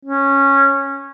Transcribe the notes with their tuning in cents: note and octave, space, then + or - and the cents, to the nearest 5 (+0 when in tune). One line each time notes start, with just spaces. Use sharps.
C#4 -10